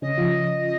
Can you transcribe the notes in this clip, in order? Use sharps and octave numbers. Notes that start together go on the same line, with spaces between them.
C#3 C#4 D#5
F3 F4